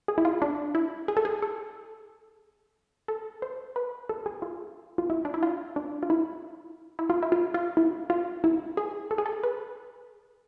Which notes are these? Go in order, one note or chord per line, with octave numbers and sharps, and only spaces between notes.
G#4
E4
F4
D4
E4
G#4
A4
G#4
A4
A4
C5
B4
A4
G#4
F4
F4
E4
D4
E4
F4
D4
F4
E4
E4
F4
E4
F4
F4
E4
F4
E4
G#4
A4
G#4
A4
B4